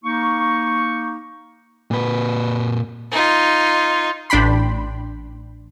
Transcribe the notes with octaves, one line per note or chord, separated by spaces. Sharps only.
A#3 D#4 C#6
A#2 B4
D#4 F4
A1 D4 G5 B5 C6